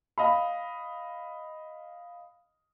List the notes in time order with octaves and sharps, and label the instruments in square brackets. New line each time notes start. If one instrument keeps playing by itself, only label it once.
[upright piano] D#5 F5 B5